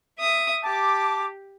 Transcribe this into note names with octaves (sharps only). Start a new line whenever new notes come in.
E5 D#6
G4 A5 D6